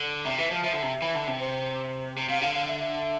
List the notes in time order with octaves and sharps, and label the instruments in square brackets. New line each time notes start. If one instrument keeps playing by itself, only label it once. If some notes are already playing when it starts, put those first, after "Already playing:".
Already playing: [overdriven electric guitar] D3
[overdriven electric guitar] C3 [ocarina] E5
[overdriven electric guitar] E3 [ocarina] E5
[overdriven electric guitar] F3
[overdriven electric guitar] F3 [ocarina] E5
[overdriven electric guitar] D3
C3
E3
D3
C3
[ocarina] C5
[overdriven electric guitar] C3
[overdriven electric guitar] C3 [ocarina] F5
[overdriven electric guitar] D3 [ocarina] F5
[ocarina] F5
E5
E5